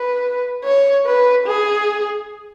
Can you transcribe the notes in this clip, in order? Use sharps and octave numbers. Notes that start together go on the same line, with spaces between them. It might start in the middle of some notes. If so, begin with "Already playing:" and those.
Already playing: B4
C#5
B4
G#4